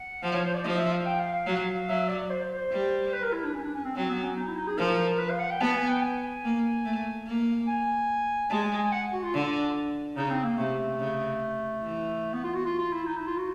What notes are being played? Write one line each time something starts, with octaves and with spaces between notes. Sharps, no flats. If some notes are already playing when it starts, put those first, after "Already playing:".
Already playing: F#5
F3 F5
C#5
C5
D5
F3 D#5
E5
F5
G5
F5
F5
F#3
F#3 E5
D5
C5
C5
C5
G3
B4
A#4
E4
D4
C#4
D4
C#4
C4
F#3 C4
B3
C#4
D#4
E4
D#4
G#4
F3 A#4
B4
F5
F#5
G5
B3 A5
G#5
G5
G#5
A#3
A3
A#3
G#5
G#3 A5
G#5
G#5
F#5
F#4
F4
D3
C#3 D#4
C4
A#3
C3 A3
C#3
E3
B3
F4
F#4
F4
F4
E4
D#4
E4
F4
F#4